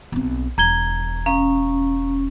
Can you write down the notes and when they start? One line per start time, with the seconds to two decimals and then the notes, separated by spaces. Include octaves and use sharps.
0.12 B1 C4
0.58 E1 A#5 G#6 G7
1.26 C#4 F5 A#5